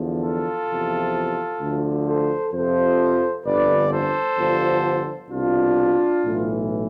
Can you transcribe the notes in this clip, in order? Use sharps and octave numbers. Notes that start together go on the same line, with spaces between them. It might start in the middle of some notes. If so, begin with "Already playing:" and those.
Already playing: E2 D3 F3
F4 A4
E2 C3 F3
D2 D3 F3
A4 C5
F2 C3 F3 A4 C5
G1 F2 D3 B4 D5
A4 C5
G1 G2 D3 F3
C2 B2 D4 F4
B1 A2 E3